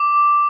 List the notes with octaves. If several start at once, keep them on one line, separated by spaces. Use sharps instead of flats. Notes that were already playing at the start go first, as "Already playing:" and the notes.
Already playing: D6